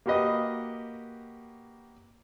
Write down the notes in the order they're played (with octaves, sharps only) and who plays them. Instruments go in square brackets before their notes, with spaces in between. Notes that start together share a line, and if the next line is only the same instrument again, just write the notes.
[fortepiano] A#3 F#4 G4 B4 D#5